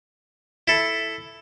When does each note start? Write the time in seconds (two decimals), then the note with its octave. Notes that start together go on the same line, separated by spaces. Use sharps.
0.68 E4 A4